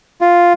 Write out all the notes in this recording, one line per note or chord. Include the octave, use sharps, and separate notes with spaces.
F4